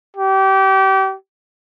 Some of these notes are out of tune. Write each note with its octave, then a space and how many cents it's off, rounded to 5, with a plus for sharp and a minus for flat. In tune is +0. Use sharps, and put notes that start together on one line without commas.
G4 -30